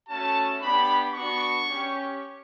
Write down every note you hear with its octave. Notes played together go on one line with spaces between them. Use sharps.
A3 C#4 F#4 A5
B3 D4 G4 B5
B3 D4 F#4 C#6
C#4 G4